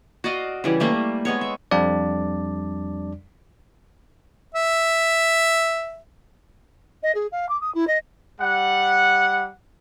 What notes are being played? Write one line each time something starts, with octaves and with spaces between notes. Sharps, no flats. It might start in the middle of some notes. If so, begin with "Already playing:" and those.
F#4 D5 D#5 F5
C#3 E3 G3
G3 A3 A#3
G#3 B3 C#5
E5
F2 G3 D4 D5
E5
D#5
G#4
F5
D6
D#6
E4
D#5
G3 F#5